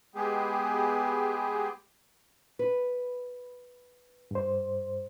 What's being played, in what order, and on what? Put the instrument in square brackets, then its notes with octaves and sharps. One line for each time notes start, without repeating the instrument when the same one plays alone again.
[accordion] G#3 B3 G4 G#4
[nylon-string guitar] B4
[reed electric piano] G2 C5